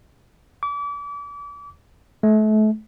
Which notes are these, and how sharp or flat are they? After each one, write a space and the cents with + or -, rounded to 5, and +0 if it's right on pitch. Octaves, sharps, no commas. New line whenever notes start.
D6 -35
A3 -35